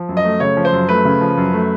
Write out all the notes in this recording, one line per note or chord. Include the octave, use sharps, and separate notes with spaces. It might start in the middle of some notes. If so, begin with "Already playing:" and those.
Already playing: F3
F#2
D#5
A3
C#3 C#5
F3
C5
F#2
A3 B4
C#3
F3
F#2
A3